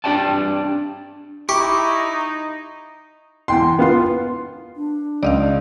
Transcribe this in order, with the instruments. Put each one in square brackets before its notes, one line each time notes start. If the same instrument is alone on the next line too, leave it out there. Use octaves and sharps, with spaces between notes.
[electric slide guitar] C4 D4 G4 D5 G5 A5
[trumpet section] D#4 [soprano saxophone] E4 [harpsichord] G4 [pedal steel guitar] C#6 D6
[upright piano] E2 G5 C6
B3 F4 C6
[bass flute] D4
[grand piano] C#2 [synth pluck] D5 D#5 F5